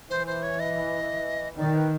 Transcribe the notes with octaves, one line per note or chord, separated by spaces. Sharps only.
E3 C5
C5
C#5
D#5
D#3 D5
B4